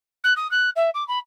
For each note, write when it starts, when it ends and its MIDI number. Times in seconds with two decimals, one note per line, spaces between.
0.24 0.33 90
0.36 0.49 87
0.51 0.69 90
0.76 0.90 76
0.94 1.06 86
1.08 1.18 83